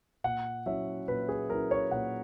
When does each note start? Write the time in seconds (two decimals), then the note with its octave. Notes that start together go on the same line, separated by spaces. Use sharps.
0.24 A#2 F#5
0.66 F#3 C#4 E4 E5
1.08 A#2 B4
1.29 G#4
1.50 F#3 C#4 E4 A#4
1.71 C#5
1.91 A#2 F#5